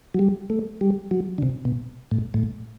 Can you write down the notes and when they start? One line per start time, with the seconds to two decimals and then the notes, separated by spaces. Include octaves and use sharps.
0.14 F#3
0.19 G3
0.50 A3
0.81 G3
1.11 F#3
1.38 D3
1.42 C3
1.65 B2
2.11 A2
2.34 A2